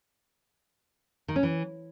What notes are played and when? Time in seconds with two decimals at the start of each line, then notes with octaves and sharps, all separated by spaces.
1.28 D#3
1.36 C#4
1.43 E3